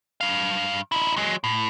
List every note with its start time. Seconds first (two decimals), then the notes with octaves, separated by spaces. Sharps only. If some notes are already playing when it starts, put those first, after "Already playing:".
0.21 G2 F5
0.92 D#4 E4
1.17 F#3 G#3
1.44 A2